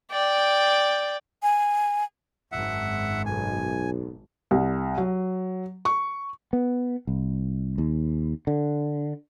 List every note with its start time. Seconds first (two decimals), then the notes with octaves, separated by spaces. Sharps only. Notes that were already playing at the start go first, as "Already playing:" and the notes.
0.12 D5 G5
1.43 G#5
2.52 G#1 F#2 E5 F#5
3.26 B1 G#5
4.51 C2
4.98 F#3
5.85 C#6
6.53 B3
7.07 C2
7.78 D#2
8.47 D3